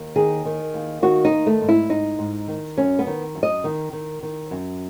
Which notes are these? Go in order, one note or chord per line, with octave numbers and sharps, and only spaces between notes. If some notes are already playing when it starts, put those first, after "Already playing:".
Already playing: D#2
D#3 G#4
D#3
D#2
D#3 F#4
D#4
D#3
A3
G#2
E4
G#2 D#4
G#2
D#3
F#2 C#4
B3
D#3
F#2
D#5
D#3
D#3
D#3
F#2